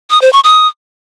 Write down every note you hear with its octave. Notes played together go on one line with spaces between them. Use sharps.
D#6
C5
C#6
D#6